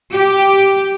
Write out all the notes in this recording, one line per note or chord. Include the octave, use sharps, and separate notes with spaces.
G4